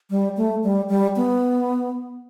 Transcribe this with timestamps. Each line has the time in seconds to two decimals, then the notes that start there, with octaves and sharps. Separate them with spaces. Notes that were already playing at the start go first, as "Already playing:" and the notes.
0.10 G3
0.37 A3
0.63 G3
0.89 G3
1.16 B3